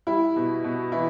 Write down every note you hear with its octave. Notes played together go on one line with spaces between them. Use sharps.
G3 E4
B2
B2
E3 E4